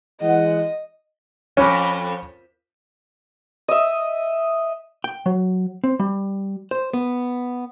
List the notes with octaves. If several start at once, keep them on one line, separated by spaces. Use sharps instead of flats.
E3 G#3 D#5 F#5
F2 C#4
D#5 E5
G5
F#3
C4
G3
C5
B3